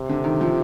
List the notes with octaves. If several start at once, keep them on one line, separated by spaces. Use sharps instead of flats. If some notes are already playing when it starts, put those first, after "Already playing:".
Already playing: C3
D3
D#3
F3